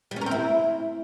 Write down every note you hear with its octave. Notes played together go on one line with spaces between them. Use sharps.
G3
C#4
A#4
C4
E4